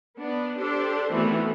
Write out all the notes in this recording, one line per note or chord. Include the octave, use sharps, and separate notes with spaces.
B3 D4
D4 G4 A4 C5
D#3 E3 A3 B3 C4 F#4